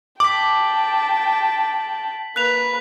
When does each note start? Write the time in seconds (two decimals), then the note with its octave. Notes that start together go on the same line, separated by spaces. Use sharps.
0.20 G5 A5 D6 B6 F#7
2.36 A#3 B4 F#6 B6 F7